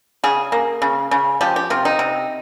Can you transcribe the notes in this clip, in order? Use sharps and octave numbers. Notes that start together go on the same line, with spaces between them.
C#3 G#4
A#3
C#3
C#3
F3 G4
G4
C3 F4
D#4
C3